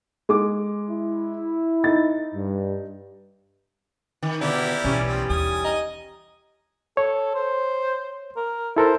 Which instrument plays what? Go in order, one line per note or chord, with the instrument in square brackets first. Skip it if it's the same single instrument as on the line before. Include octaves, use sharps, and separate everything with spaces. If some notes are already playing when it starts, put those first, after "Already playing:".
[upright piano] G#3 D6
[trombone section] E4
[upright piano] D#4 A6
[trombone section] G2
[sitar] D#3
[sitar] B2 D3 [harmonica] A#3 E4 G4 [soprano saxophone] D5
[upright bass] B1 A2 [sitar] E3 G3 C#4
[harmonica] F3 C4
[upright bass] D#2 [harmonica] G#5 D#6
[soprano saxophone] D#5
[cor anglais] A4 [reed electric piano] C#5
[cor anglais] C5
A#4
[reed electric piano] E4 A4 A#4 [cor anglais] C5